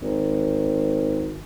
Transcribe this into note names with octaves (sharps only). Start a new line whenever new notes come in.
G#1